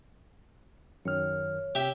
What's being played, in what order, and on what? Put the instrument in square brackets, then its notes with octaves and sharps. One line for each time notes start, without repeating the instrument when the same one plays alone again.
[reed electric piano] F#2 D#3 F6 [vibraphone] C#5
[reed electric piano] C3 [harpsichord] G4 E5 G5